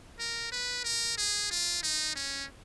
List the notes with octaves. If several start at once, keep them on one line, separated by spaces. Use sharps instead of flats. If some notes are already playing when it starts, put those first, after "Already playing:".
A#4
B4
A#4
G#4
F4
D#4
C#4